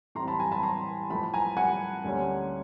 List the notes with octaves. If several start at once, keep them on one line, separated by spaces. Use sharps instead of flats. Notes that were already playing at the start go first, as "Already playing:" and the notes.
A2 E3 G3 C4 A#5 C6
A5 B5
G#5 A#5
A5 B5
A#5 C6
A2 F3 A3 A5 B5
G#5 A#5
F#5 G#5
D2 D3 G3 A#3 C#4